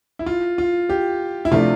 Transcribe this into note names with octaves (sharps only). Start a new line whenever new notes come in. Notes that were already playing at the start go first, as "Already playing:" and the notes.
E4
F4
F4
G4
E4
C3 F3 A3 D4 F4